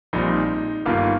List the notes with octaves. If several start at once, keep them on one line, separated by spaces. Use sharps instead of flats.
A#1 A#2 G3 C4 D#4
G1 G2 D#3 A#3 F4